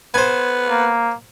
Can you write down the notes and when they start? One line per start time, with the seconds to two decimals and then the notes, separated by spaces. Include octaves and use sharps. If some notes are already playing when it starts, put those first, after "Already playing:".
0.14 B3 C5 G#5
0.70 A#3